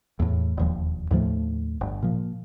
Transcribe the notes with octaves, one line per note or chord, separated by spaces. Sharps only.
E2 A2
E1 D#2 F3
D#2 A2 F3 A3
G1
A#2 F3